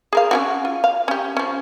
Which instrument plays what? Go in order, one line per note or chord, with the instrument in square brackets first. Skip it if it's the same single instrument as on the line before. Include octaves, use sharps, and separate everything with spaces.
[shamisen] G#4 A#4 F5
C#4 E4 F#4
F4
F5
C#4 G4
F3 C#4